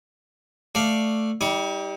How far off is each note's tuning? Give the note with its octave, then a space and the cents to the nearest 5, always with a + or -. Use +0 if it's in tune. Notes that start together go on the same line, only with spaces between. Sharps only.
A3 +0 D5 +0 F5 +0
G3 +0 D#4 +45 D6 +0